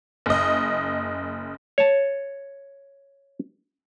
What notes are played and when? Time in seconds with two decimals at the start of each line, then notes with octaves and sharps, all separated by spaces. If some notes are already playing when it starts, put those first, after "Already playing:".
0.26 F#1 D#5
1.78 C#5 A5